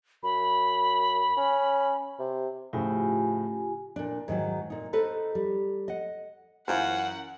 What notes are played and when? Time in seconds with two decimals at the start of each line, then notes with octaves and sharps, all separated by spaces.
0.23 F#2 B5
1.37 C#4
2.19 C3
2.73 A2 C#3 F3 F4 G4 G#5
3.96 A#2 D4
4.28 G#2 D#3 E3 F#3
4.70 A#2 D#4
4.93 D#4 A4 B4 C5 D#5
5.35 G3
5.88 D#5 F#5
6.68 F#2 E3 F4 C5 F#5